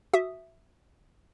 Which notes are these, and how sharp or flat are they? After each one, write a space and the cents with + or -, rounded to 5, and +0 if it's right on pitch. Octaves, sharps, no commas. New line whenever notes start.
F#4 +0 E5 +0 D#6 -10